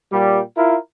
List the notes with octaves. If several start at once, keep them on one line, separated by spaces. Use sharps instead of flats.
A#2 G3
E4 F4 A#4